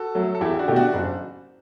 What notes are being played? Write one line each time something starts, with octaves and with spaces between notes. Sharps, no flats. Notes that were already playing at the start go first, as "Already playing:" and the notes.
Already playing: F#4 A4
F#3 A3
A4
E2 E4 G4
D4 F#4
B2 A3 E4 G4
D4 F#4
F#1